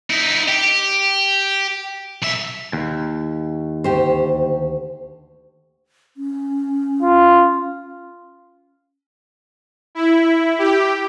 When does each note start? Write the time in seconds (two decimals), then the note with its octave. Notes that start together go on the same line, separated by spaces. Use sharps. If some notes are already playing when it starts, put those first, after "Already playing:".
0.10 D#4 E4
0.48 G4
2.22 B1 E5
2.73 D#2
3.84 D2 G4 C5
6.17 C#4
7.02 F4
9.95 E4
10.59 G4